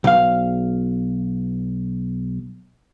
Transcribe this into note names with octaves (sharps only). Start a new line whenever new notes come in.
B1 F5